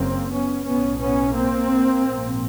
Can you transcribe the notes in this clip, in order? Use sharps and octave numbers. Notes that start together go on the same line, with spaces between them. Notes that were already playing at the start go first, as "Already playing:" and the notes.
Already playing: F#1 F#2 C#3 A#3 C4
B3 C#4
B1 A2 B3 C#4
B3 C#4
A#3 C4
A#1 G#2